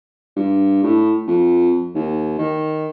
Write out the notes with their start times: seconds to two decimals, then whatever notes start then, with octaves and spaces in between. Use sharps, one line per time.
0.37 G2
0.83 A2
1.27 F2
1.95 D#2
2.39 D#3